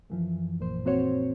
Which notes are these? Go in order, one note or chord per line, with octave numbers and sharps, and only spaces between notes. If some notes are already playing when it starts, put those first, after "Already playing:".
F#2 E3 F3
A1 A#2 C5
A#3 C4 F#4 C5 C#5